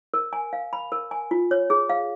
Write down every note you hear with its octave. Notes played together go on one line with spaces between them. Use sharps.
A#4
G#5
F5
B5
A#4
G#5
F4
C#5
G#4
F5